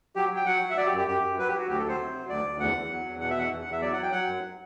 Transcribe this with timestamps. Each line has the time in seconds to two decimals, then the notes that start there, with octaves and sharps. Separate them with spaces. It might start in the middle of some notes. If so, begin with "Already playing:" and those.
0.16 F#3 G4
0.31 F#3 G5
0.46 F#3 F#5
0.62 F#3
0.70 E5
0.77 F#3 D5
0.87 G4
0.92 F#2
0.97 G4
1.08 F#2 G4
1.23 F#2
1.38 F#3 B4
1.49 G4
1.53 F#3
1.58 F#4
1.69 D2 G4
1.79 A4
1.84 F#3 C5
2.00 C3
2.14 F#3
2.29 D2 D5
2.44 D2
2.60 E2 F#5
2.75 E2
2.91 F#3
3.06 E2
3.21 B2 F#5
3.30 E5
3.36 E2 F#5
3.52 E2
3.61 F#5
3.68 E2 E5
3.82 F#3 D5
3.93 F#5
3.98 F#3 G5
4.12 F#3 F#5
4.27 F#2